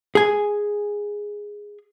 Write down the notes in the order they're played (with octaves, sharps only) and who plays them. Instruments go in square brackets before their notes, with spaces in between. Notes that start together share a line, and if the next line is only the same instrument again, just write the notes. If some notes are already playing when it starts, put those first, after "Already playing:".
[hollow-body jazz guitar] G#4 G#5